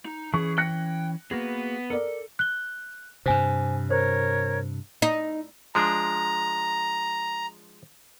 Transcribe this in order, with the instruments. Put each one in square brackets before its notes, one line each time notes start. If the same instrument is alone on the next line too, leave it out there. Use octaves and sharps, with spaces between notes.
[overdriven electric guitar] D#4
[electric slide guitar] E3 C#4 [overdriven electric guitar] G#4 [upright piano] C#6
[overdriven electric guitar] G5 [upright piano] F#6 A#6 C#7
[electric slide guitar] A#3 F#4 G#4 [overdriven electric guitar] B3
[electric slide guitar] A4 [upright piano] A#4 D5
[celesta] F#6 G7
[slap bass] G2 C3 [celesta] C5 G#5
[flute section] A#4 C#5 [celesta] C5
[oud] D#4
[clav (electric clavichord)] F3 G#3 D4 [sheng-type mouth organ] A#5